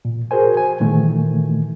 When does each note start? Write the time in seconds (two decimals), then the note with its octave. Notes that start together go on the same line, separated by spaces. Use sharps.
0.05 A#2
0.31 F#4 G#4 A#4 C5 G#5
0.57 G#5
0.81 A#2 D#3 E3 A3